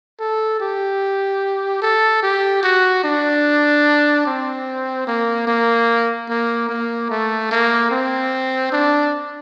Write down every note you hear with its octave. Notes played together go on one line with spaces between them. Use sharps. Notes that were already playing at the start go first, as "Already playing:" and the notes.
A4
G4
A4
G4
F#4
D4
C4
A#3
A#3
A#3
A#3
A3
A#3
C4
D4